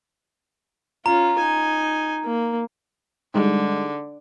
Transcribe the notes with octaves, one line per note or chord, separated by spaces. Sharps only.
C#4 F4 A#5
D#4 G#5
A#3
D3 G3 G#3 D#4